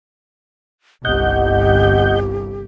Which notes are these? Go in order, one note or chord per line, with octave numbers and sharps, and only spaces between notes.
G1 C2 G4 D#5 F#5 G6